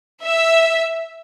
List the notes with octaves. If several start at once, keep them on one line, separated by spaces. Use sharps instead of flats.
E5